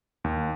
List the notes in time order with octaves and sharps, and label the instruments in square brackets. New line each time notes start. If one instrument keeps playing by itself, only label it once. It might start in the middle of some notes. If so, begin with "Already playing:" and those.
[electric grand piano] D#2